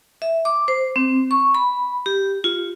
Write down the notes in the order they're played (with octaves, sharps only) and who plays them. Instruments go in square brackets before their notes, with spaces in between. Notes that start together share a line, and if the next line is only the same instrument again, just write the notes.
[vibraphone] E5
D6
C5
C4
C#6
B5
G4
F4